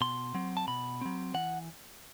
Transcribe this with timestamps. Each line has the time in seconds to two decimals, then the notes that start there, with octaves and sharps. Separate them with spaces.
0.01 B2 C6
0.35 F#3 C4
0.57 A5
0.68 B2 B5
1.01 F#3 C4
1.34 E3 F#5